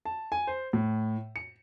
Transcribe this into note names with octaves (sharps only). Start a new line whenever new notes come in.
A5
G#5
C5
A2
C#7